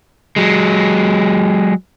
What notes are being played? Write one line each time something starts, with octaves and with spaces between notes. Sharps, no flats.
F#3 G#3